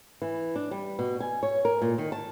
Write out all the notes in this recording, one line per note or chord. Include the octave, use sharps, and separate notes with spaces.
E3
D4
G3
B2
G#5
C#5
A#4
A#2
D#3
A5